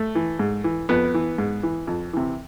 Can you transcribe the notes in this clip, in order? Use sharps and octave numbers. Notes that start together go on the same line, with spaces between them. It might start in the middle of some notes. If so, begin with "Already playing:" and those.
Already playing: A3
E3
G#2
E3
F2 B3
E3
G#2
E3
F2
C3 E3